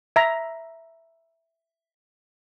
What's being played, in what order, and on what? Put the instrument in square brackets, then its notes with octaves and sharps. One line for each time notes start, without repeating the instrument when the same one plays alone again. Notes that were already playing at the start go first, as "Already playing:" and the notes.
[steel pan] E5 A#5